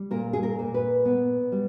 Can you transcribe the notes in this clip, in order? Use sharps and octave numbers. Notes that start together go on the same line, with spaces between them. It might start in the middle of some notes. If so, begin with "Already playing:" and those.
Already playing: G3
A#2 A#4
G#4
A#4
A#2
B4
B3
G3